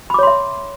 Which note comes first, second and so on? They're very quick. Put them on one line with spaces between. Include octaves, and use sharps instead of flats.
B5 D6 C#5 C6 E5